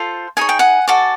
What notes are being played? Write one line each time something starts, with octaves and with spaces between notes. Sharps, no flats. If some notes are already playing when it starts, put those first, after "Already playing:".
Already playing: F4 A4 C5
D#4 G#4 C#5 G#5
G5
F#5 G#5
F#4 A4 D5